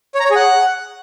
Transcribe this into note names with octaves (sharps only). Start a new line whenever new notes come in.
C#5
A#5
C#5
G#4
F#5